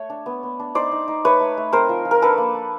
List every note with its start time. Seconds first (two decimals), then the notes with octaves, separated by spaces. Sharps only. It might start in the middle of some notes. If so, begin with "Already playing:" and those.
Already playing: A3 C#5
0.10 D4
0.26 B3
0.43 B3
0.59 D4
0.75 D#4 C5 D5
0.92 D#4
1.08 D#4
1.24 A3 B4 C#5
1.41 A3
1.57 A3
1.73 C4 A#4 C5
1.89 F3
2.05 F3
2.11 A#4
2.22 D4 A4 B4
2.38 A#3
2.54 D4